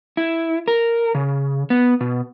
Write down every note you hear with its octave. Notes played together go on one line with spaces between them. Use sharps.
E4
A#4
C#3
B3
B2